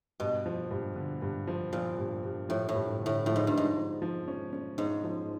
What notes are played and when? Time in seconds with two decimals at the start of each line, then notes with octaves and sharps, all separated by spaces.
0.20 G2 B2
0.46 F3
0.71 G2
0.96 D3
1.22 G2
1.47 F3
1.73 A#2 F3
1.98 G2
2.23 G2
2.49 A2 F3
2.69 A2
2.75 G2
3.00 D3
3.06 A2
3.26 A2 F3
3.36 G#2
3.47 G2 F3
3.57 G#2
3.76 F3
4.02 F3
4.28 C#4
4.53 C#4
4.78 G#2 C#4
5.04 F3